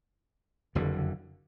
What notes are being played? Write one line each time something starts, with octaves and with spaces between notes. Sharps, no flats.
F#1 F2 D3